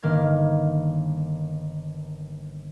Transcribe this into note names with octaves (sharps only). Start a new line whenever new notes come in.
G1 D#3 A#3 F6 G#6